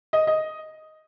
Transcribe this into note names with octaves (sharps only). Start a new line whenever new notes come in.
D#5
D#5